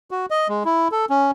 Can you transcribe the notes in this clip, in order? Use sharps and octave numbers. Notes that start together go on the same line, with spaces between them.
F#4
D#5
G#3
E4
A4
C#4